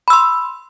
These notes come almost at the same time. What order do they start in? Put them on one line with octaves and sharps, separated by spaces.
B5 E6 C6